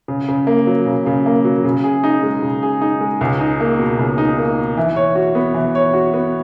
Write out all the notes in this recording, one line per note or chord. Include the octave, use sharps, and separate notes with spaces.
C#3
C#3
A#3
F#3
C#3
C#3
A#3
F#3
C#3
G#4
D#4
G#3
C#3
G#4
D#4
G#3
C#2
D#4
A#3
B2
C#2
D#4
A#3
B2
E3
C#5
F#4
B3
E3
C#5
F#4
B3